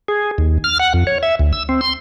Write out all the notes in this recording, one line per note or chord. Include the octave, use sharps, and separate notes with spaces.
G#4
D#2
F6
F#5
F2
C#5
E5
D2
E6
C4
C6